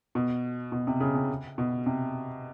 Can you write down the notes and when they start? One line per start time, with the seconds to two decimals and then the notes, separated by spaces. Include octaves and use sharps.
0.15 B2
0.72 B2
0.87 C3
1.00 C#3
1.15 C3
1.58 B2
1.86 C3